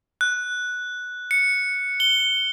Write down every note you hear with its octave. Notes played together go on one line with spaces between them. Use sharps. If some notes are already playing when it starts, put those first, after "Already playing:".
F#6
C#7
G7